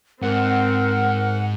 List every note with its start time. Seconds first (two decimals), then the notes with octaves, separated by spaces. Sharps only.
0.22 G#2 C4 A#4 F#5